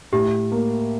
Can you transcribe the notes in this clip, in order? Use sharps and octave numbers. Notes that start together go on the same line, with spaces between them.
A2 G4
A#3